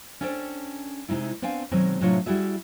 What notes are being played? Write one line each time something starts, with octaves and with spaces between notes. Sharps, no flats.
C#4 D4 A4 C5 G5
C3 G#3 D#4 E4
B3 C4 D4 F5 G5 G#5
B2 D#3 F#3 G#3 C4
A2 C3 F#3 D4 F4 C#5
G3 E4 F#4 G#4 E5